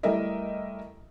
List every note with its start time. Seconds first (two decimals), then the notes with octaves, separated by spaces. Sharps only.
0.03 G3 A3 E4 A#4 D#5 E5